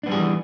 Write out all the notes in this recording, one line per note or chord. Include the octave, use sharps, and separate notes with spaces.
E3 G3 B3 D4 G#4